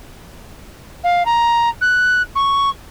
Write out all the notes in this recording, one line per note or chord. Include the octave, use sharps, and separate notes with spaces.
F5
A#5
F#6
C#6